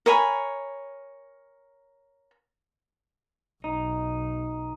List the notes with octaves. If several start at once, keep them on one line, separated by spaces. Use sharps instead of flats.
A#4 C#5 G#5 B5
B1 D#4